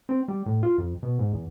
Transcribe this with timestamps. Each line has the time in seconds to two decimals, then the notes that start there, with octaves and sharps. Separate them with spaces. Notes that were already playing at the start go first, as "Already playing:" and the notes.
0.09 C4
0.28 G3
0.46 A2
0.63 F4
0.78 F2
1.03 B2
1.19 G#2
1.33 E2